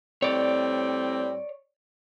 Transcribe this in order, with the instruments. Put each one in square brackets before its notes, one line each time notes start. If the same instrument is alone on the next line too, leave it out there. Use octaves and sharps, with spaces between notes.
[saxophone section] A2 G3 C4 [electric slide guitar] C#5 D5